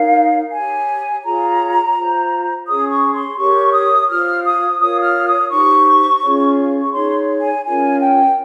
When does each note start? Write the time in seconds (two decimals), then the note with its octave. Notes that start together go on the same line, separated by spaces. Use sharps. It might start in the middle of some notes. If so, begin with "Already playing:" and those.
Already playing: D#4 A#4 C#5 F5
0.53 G4 C#5 G#5
1.24 F4 G#4 C#5 A#5
1.95 F4 C5
2.65 C#4 G#4 C#5 D#6
2.90 C#6
3.13 C6
3.37 G4 A#4 C#5 C#6
3.72 D#6
4.08 F4 C5 F6
4.44 D#6
4.79 F4 A#4 C#5 D#6
5.03 F6
5.27 D#6
5.50 D#4 G4 C5 C#6
6.22 C#4 F4 G#4 C#5
6.82 C#6
6.92 D#4 G#4 C#5 C6
7.40 G#5
7.63 C#4 F4 A#4 C#5 G#5
7.99 G5